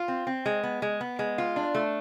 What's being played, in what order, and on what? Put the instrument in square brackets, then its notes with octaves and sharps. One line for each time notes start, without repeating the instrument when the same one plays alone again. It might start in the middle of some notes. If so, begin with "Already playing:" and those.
Already playing: [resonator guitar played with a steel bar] F4
C4
C4
G#3
B3
G#3
B3
G#3
F4
D4
A3